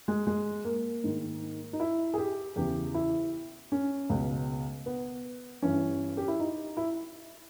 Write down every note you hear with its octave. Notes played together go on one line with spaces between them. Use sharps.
G#3
G#3
A#3
G#2 D#3
D#4
E4
G#4
G4
E2 C#3 E3 G4
E4
C#4
C#2 B2
B3
G2 E3 C#4
G4
E4
D#4
E4